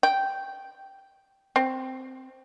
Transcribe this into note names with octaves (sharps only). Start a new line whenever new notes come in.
G5
C4